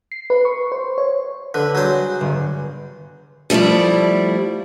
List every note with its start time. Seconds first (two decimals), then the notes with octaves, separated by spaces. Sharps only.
0.12 C7
0.30 B4
0.45 C#6
0.72 C5
0.98 C#5
1.54 D3 B4
1.75 F#3 G3 G#4 C5
2.21 G1
3.50 F3 G3 A3 E4 D5